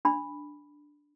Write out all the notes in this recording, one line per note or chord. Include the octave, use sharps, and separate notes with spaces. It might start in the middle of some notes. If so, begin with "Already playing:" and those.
D4 B5